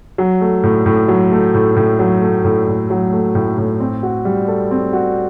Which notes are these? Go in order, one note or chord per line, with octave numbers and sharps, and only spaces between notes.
F#3
A3
A2
A2
F#3
A3
A2
A2
F#3
A3
A2
A2
F#3
A3
A2
A2
C4
F#4
G3
A4
C4
F#4